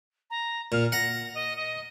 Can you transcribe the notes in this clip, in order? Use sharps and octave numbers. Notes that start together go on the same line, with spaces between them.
A#5
A#2 F5
F#5 A#5 A#6
D#5
D#5